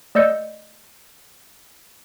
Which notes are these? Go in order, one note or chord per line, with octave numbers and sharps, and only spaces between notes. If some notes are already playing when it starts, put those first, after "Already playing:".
A3 D5 D#5 E6 G6 C#7